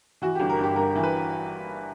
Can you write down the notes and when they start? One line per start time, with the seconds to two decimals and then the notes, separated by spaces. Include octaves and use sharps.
0.22 E3 F#4
0.35 G1 G4
0.50 A#4
0.59 G2 G4
0.76 G1 A#4
0.96 E3
1.03 B4